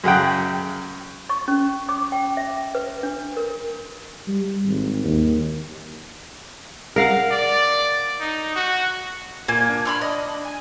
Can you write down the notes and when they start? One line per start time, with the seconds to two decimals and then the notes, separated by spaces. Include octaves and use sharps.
0.04 F#2 C#3 F#5 G5
1.29 C#6
1.48 C#4
1.89 D6
2.12 G5
2.37 E5
2.75 B4
3.03 D4
3.37 A#4
4.28 G3
4.65 G#1
5.04 D#2
6.96 A#4 F5 F#5
7.31 D5
8.20 D#4
8.56 F#4
9.48 A#2 A#3 G#5
9.69 D4
9.85 B5 C6 F6
10.01 D#5
10.45 G#5